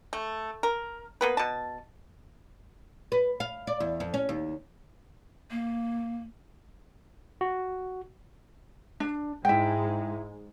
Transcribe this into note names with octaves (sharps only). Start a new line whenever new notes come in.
A3
A#4
A#3 B3 B4
B2 A5
B4
F5
D5
E2
F2
C#4
D#2
A#3
F#4
D4
G#2 G#3 E4 G5